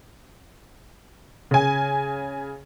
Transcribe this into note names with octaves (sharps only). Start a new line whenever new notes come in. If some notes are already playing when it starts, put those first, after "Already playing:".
C#3 G#5